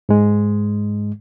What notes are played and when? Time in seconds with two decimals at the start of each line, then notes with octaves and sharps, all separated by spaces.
0.09 G#2 G#3